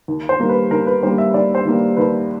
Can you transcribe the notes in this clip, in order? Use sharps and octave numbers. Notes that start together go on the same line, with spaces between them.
D#2
C5
D#3 G3 A#3 A#4
B4
D#2 A#4
B4
D#3 G3 A#3 C5
E5
D#2 D5
C5
D#3 G3 A#3
D#2 B4